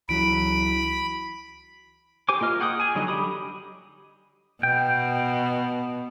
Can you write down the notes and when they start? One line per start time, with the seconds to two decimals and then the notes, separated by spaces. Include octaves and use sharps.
0.09 C#2 E3 F#3 E4 F#4 B5 D7
2.29 G4 C5 G#5 D6
2.41 A#3 F4 D#5 F6
2.60 G#4 F#5 G5 D6 D#6
2.80 G#4 G#5
2.95 D3 F#3 G3 D#4 D#5
3.08 D3 F#3 G4 B5 D#6
4.63 B2 G5